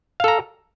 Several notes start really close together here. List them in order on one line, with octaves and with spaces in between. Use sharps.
F5 A4 A#5